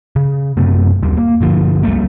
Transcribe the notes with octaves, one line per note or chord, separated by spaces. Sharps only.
C#3
F#2 C3 A3 B3
F#1 D#2 G3
A#3
G1 D3 F3
C#2 G3 A3 A#3